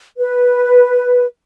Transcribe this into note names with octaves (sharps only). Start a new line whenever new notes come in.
B4